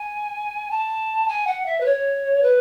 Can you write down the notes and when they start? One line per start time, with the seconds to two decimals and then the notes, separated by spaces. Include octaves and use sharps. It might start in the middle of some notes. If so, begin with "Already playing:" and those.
Already playing: G#5
0.71 A5
1.28 G#5
1.47 F#5
1.66 E5
1.80 B4
1.85 C#5
2.43 B4